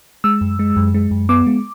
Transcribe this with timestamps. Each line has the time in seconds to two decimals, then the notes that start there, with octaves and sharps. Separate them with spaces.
0.24 G#3 E6
0.41 F#2
0.59 G#3
0.76 F#2
0.94 G#3
1.11 F#2
1.29 B3 D6
1.47 G#3